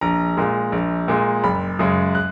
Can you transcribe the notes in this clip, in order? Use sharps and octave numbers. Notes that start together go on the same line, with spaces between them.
A#1 A#5
A#2 G#3
A#1
A#2 G#3
F#1 B5
F#2 C#3 G#3 D#6
F#6